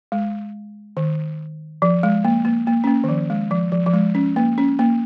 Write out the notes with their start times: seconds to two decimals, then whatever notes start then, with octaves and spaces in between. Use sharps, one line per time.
0.12 G#3
0.97 D#3
1.82 F3
2.03 G#3
2.25 A#3
2.45 A#3
2.67 A#3
2.84 C#4
2.87 A#3
3.04 D#3
3.09 F3
3.30 G#3
3.51 F3
3.72 F3
3.86 F3
3.94 G#3
4.15 C#4
4.36 A#3
4.58 C#4
4.79 A#3